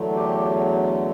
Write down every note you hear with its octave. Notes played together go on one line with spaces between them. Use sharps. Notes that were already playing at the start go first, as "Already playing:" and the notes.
Already playing: E2 D3 F#3 A3
G4